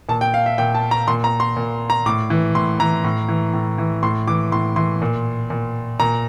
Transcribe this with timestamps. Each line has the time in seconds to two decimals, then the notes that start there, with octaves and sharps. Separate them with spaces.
0.09 A#2 A5
0.21 G5
0.34 F5
0.46 E5
0.58 A#2 G5
0.75 A5
0.91 A#5
1.08 A#2 C6
1.24 A#5
1.40 C6
1.57 A#2
1.90 A#5
2.06 A2 D6
2.30 E3
2.55 A2 C6
2.80 E3 A#5
3.04 A2
3.29 E3
3.53 A2
3.78 E3
4.03 A2 C6
4.27 E3 D6
4.52 A2 C6
4.76 E3 C6
5.02 A#2
5.50 A#2
6.00 A#2 A#5